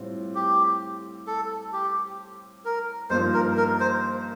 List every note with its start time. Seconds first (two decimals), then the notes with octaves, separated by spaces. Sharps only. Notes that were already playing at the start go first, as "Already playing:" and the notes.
Already playing: A2 G3 C4 F4
0.35 G4
1.27 A4
1.73 G4
2.65 A#4
3.10 G2 F3 A#3 D#4 C5
3.34 A#4
3.57 A#4
3.80 C5